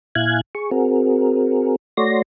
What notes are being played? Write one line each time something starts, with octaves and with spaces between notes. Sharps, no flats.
A#2 E4 F5 G#5 F#6 G#6
G#4 C#6
C4 F#4 G#4 A#4
A3 F#4 C#5 D5 C6 A#6